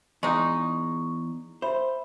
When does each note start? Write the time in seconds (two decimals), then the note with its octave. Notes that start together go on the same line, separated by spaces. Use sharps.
0.23 E2 G#3 D#4 C#6
1.62 C5 E5 B5